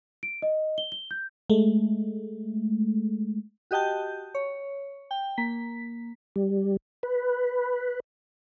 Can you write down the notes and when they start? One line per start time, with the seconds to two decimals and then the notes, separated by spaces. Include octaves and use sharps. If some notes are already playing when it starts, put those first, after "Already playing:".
0.23 D7
0.42 D#5
0.78 G7
0.92 G7
1.11 G6
1.50 G#3 A3
3.71 F#4 G4 D#5 G5 A5 G6
4.35 C#5
5.11 G5
5.38 A#3 B6
6.36 G3
7.03 B4